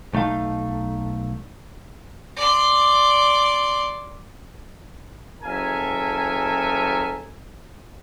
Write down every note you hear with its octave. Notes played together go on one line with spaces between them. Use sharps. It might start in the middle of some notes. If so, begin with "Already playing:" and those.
B1 A3 D#4 F5
D5 C6
F#1 A4 A#4 E5 G#5